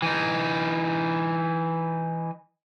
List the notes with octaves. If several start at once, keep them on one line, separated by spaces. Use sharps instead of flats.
E3 D#4